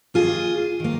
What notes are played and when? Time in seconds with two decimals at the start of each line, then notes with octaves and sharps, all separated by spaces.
0.14 D#3 A#3 F4 G#4
0.80 D#3 A#3